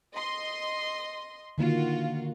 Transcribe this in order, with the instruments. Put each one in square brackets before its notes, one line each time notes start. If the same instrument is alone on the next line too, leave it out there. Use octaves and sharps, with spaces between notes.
[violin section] D#5 C6
[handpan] D3 D#3 A#3 [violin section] F4 F#4